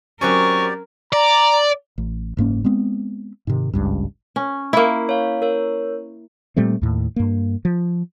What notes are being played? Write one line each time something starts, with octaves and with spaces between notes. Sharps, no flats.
F#3 C4 C#4 G4 A#4 D5 C#6
D5 A#5
A1
F#1 G#2 A#3 C#4
G#3 B3 C4
G#2 C3 D#3
G#1 C#2 G2
C#4
A#3 E4
C#5 F5
A#4 C#5
A#2 G3 A3 C4
D#2 A2
G2 A#3
F3